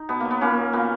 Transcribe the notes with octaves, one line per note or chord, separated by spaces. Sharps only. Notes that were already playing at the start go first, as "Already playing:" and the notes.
Already playing: D#4
B2 B3
F#3 A#3
B3
A#2 A#3 C#4
F#3
A#2 B3